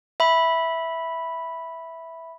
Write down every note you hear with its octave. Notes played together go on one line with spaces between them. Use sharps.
E5 B5